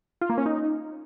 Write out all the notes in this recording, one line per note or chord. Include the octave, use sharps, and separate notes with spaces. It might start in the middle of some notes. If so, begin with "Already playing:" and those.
F4
A#3
C#4
D#4